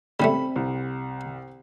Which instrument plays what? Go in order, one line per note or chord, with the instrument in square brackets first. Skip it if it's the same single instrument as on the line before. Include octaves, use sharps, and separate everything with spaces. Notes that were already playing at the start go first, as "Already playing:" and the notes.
[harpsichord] C#3 G3 A3 [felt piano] C4 [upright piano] B5
[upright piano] C2